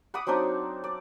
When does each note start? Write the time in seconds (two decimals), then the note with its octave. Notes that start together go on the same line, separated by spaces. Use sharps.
0.14 F#5 B5 D6 D#6
0.27 F#3 C4 D4 D#4
0.84 D5